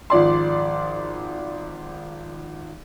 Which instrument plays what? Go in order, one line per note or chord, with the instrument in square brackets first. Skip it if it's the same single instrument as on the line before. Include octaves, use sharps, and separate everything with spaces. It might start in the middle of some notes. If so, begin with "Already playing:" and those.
[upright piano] G#1 F3 D5 C6